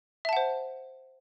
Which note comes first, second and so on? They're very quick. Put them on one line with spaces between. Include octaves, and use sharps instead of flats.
E5 A5 F#5 C5